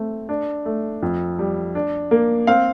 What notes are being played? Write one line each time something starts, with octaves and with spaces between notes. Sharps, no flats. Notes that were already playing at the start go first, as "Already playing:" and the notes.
Already playing: A3 C4
D4
A3
F2
G3
D4
A#3
C4 F5